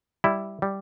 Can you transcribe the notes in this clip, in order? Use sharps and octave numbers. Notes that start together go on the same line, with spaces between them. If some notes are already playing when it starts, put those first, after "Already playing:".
G3 E4
G3